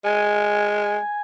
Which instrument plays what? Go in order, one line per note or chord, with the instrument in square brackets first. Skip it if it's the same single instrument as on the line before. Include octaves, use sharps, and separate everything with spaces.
[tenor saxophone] G#3 [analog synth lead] G#5